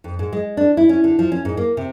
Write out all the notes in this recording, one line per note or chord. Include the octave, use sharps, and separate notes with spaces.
F2
G#2
G#3
D4
E4
C#4
D3
F3
C#4
G#2
A#3
C3